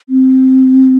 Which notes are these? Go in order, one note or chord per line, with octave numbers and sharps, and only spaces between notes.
C4